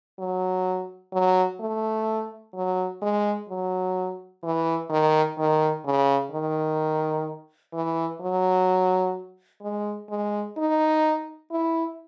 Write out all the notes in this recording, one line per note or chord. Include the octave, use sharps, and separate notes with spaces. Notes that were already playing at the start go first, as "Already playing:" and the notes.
F#3
F#3
A3
F#3
G#3
F#3
E3
D#3
D#3
C#3
D#3
E3
F#3
G#3
G#3
D#4
E4